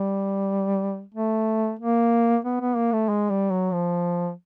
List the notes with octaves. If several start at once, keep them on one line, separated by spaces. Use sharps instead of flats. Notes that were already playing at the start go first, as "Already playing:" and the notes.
Already playing: G3
A3
A#3
B3
B3
A#3
A3
G#3
G3
F#3
F3